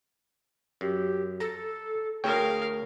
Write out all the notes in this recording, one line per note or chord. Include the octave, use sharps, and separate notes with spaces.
F#2 G4
A4 A#5
D2 G#4 A#4 C#5 F5 G5